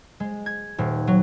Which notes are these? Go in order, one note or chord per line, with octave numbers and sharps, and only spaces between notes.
G#3
G#6
D#1
F#3